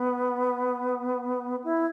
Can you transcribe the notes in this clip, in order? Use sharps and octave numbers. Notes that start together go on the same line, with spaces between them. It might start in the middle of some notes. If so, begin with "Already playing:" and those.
Already playing: B3
E4